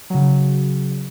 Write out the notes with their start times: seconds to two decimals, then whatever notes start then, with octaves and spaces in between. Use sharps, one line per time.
0.10 C#3 F#3